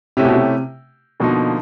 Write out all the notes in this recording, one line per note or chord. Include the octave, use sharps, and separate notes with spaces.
C3 A3 C#4 E4 G4
B2
C3
B2 D3 F3 A#3 D#4